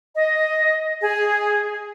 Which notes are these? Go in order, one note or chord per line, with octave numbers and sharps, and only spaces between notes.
D#5
G#4